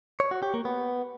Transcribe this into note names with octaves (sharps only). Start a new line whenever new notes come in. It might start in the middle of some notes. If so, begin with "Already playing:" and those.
C#5
F#4
G4
A#3
B3